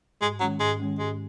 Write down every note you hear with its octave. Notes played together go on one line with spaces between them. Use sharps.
G#2 G#3
D#3 F#3 G#3 C#4
G#2 G#3
D#3 G#3 C#4
G#2 G#3